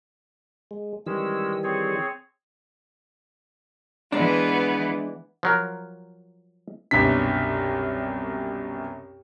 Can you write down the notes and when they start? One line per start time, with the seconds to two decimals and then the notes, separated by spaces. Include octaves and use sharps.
0.71 G#3
1.06 D#3 E3 G3 G#3 C#4 E6
1.64 C4 G#4 C#5
4.12 E3 G#3 B3 D4
5.43 F3 F#3 A#4
6.91 C2 F#2 B2 D4 B6